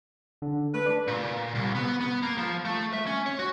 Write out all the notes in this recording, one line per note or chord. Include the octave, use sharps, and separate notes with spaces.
D3
A3 B4
D4
A#2
C2
B3
B3
A#3
F3
A3
E5
C#4
C#5
F#4